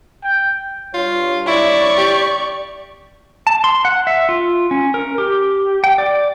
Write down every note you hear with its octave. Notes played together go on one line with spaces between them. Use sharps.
G5
G2 F4 C#5
E4 D5 C#6
G4
A5
C6
F#5
E5
F4
C#4
A#4
G4
G5
D5